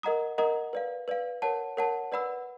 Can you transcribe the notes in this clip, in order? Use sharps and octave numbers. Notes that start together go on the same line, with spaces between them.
A#4 D#5 F#5 A#5 D#6
A#4 D#5 F#5 A#5 D#6
B4 D5 F5
B4 D5 F5
A#4 C#5 F#5 A5
A#4 C#5 F#5 A5
B4 D5 F#5 B5 E6